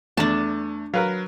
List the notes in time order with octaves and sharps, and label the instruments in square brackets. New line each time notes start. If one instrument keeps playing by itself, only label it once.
[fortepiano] E2 [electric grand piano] A3 [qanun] D4 A5
[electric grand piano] F#3 [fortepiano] A#4 B4 F5